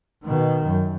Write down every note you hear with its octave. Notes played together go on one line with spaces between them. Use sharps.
B2 D#3
F#2